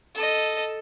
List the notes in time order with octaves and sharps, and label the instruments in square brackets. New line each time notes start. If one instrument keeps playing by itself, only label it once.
[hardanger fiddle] A4 D#5